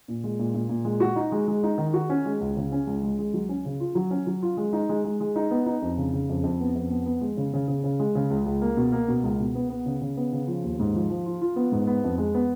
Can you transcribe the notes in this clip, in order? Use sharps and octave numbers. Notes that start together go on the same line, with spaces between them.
A#2
G#3
A#2
A#2
A#2
G#3
F#4
D#4
G#3
G#3
D#4
D#3
F#4
C#4
G#3
C#2
C#3
C#4
C#2
G#3
G#3
F#3
C#4
C#3
F4
F#3
C#4
F#3
F4
G#3
D#4
G#3
G#3
G#3
D#4
B3
D#4
F2
C#3
C#3
F2
F2
B3
F2
B3
B3
G#3
C#3
C#3
C#3
C#3
G#3
C#3
C#2
C#2
A#3
B2
A#3
B2
C#2
B2
B3
B3
C#3
C#3
B3
C#3
F3
D#2
G#2
F3
F3
F4
F4
B3
G#2
B3
F2
G#3
B3